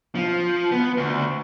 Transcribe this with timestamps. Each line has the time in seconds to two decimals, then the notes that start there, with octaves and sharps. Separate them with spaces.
0.15 F3
0.72 B3
0.97 D2